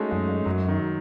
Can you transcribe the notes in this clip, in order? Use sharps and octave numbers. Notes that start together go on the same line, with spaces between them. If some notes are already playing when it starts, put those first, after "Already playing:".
Already playing: G#3 A3 C#4 D#4 F#4
F#2 G#3
G#3
F#2 F#3
D#3